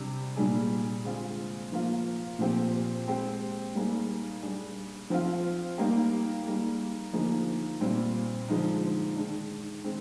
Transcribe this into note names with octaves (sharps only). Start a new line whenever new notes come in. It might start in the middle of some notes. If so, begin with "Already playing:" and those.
Already playing: C3 G3 D4
A#2 G3 D4 G#4
D3 G#3 C4 F4 G#4
F3 A#3 F4
A#2 F3 C4 G4
G#3 C4 G4
G3 A#3 D#4 G#4
G3 D4 G#4
F3 C4 F4
G3 A#3 D#4 G4
G3 A#3 D#4 G#4
D3 F3 A#3 D#4 G#4
A#2 G3 C4
D3 F3 G#3 D#4
D#3 G#3 D4
D#3 G#3 C4